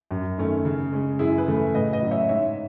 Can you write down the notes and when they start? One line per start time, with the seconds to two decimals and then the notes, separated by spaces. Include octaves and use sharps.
0.11 F#2
0.38 D#3 A3 C#4
0.65 C#3
0.92 G#3 C#4
1.19 F#2 E4 G#4
1.38 G#4 B4
1.47 C#3 E3 A3
1.56 G#4 B4
1.74 A2 B4 D#5
1.92 B4 D#5
2.02 F#3 C#4
2.11 C#5 E5
2.29 G#2 C#5 E5